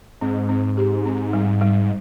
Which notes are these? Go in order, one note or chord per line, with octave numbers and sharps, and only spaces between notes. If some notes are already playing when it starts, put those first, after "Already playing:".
G#2 C4
C4
G4
C4
G3
G3